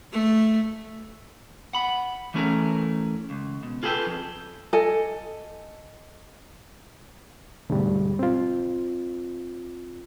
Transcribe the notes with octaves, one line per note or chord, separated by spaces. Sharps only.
A3
F#5 B5
E3 A3 C#4 G#4 A#4
C#2
B2
F4 G#4 A4 B4 G5
F2
A4 D#5 G#5
D2 G#2 B2 G3
C4 F4